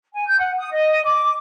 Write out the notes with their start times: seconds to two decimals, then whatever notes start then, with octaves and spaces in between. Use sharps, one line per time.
0.13 G#5
0.27 G6
0.39 F#5
0.58 D#6
0.72 D#5
1.04 D6